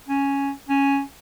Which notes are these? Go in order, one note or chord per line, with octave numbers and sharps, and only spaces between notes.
C#4
C#4